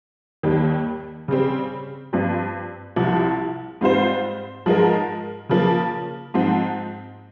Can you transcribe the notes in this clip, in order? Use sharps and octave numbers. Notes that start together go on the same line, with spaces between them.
D#2 D#3 G3
C#3 G3 C4
G2 F3 C4
C2 C3 F3
G#2 G3 C4 F4 C5
G#2 F3 G#3 D#4 A#4
C#3 F3 A#3
G#2 F3 C4